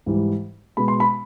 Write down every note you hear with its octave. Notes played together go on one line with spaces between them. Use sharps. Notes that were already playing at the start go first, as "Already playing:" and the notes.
G#2 E3 G3
B2 G#3 B3 B5
C6
B5